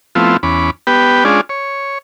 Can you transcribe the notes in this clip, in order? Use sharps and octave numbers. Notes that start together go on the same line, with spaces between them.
F3 A3 B3 C4 E4 F4
E2 C#4 B5 D6
B3 G4 B4 G5
G#3 C#4 D4 F4 G#4 D5
C#5